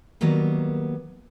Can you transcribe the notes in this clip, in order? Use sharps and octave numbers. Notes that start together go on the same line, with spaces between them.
D#3 F#3 G3 A#3 B3